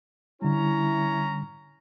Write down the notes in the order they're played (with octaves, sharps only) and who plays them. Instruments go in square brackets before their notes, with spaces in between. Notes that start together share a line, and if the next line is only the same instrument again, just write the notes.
[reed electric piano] D3 G3 [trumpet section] C#4 C#5 A#5 [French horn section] E4